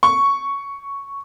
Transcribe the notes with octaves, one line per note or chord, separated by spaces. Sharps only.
C#6